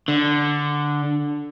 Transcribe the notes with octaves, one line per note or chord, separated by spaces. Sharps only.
D3